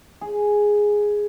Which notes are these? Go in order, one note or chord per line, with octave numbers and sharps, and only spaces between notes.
G#4